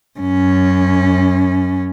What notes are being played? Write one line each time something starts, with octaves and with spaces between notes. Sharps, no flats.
F#2 C#4